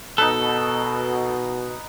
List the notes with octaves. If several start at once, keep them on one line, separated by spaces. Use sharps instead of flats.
B2 D#4 A4 B4